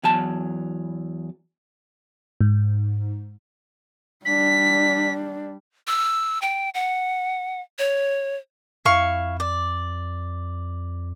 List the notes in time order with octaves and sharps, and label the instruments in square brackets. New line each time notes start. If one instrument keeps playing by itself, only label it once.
[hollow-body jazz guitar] E2 F#3 A5
[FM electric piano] G#2
[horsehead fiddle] G3 D4 [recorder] B6
[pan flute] E6
G5
F#5
C#5
[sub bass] F2 [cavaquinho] E4 F5 C#6
[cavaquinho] D5